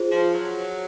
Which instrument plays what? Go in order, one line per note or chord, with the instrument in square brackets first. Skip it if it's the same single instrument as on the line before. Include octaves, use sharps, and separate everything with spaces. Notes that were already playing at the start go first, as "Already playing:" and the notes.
Already playing: [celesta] F4 G#4 C5
[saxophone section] F3
F#3